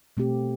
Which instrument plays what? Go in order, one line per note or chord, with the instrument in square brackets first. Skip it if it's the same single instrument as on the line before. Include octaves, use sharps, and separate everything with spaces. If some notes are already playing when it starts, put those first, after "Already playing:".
[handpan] B2 A3 C4 G4